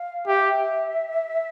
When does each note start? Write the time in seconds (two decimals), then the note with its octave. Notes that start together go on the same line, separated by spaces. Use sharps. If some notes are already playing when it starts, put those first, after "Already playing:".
Already playing: F5
0.27 G4 E5
0.35 F5
0.42 E5